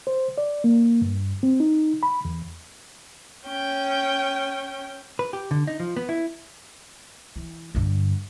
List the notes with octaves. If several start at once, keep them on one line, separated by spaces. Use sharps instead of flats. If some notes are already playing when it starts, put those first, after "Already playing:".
C5
D5
A#3
G2
C4
D#4
B5
E2
C#4 G5
B4
G4
D3
D#4
F3
B3
E4
E3
G2 D3